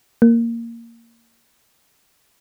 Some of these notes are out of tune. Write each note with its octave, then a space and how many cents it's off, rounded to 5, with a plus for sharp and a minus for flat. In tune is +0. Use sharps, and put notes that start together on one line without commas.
A#3 -10